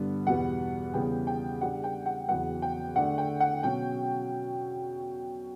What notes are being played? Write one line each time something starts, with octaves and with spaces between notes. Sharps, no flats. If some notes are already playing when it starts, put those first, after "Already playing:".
Already playing: G2 D3 G3 B3 D4
E2 B2 G3 B3 F#5
E2 C#3 G3 B3 G5
G5
C#3 G3 D4 F#5
G5
F#5
E2 C#3 F#3 B3 F#5
G5
D3 A3 D4 F#5
G5
F#5
B2 F#3 C#4 G5